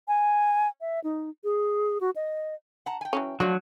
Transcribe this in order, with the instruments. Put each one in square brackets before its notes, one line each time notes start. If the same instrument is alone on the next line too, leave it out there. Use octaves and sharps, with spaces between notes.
[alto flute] G#5
E5
D#4
G#4
F#4
D#5
[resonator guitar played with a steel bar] F#5 A5 A#5
G5 G#5
[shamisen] E3 F#3 C#4
[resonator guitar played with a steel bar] F3 A3 D4 [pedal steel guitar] F#3 [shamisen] F#4 D5